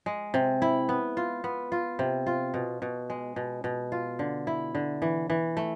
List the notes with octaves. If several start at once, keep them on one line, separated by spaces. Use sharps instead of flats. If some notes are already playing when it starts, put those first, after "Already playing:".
G#3
C3
E4
B3
F4
B3
F4
C3
F4
B2
B2
G#3
B2
B2
F4
D3
E4
D3
E3
E3
A3